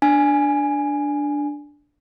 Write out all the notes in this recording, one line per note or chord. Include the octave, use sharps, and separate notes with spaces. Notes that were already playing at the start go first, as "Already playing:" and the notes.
D4 G#5